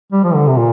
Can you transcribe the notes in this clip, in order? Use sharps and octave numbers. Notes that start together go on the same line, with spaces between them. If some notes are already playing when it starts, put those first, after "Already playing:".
G3
F3
D3
C3
A#2